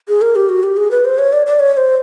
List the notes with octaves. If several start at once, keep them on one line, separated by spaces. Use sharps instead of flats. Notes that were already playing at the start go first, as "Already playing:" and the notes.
G#4
A#4
G4
F#4
G4
G#4
B4
C5
C#5
D5
D5
C#5
C#5
C5